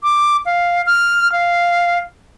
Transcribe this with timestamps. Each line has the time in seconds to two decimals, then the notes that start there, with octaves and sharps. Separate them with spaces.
0.03 D6
0.46 F5
0.87 F6
1.32 F5